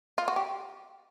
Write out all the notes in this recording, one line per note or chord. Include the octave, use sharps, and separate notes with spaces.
F4
F#4
G4